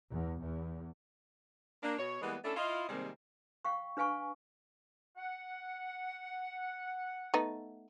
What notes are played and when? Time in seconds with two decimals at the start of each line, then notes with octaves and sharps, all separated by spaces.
0.11 E2
0.40 E2
1.83 A#3 D4
1.98 B2 C#5
2.22 E3 G3 G#3 A#3 B3
2.45 A3 C#4 D4 E4 A4
2.57 E4 F4 D#5
2.89 C3 D#3 G3 G#3 A#3 C4
3.65 F5 G5 C#6
3.97 D4 B4 F5 G#5 C#6
5.17 F#5
7.34 A3 B3 D#4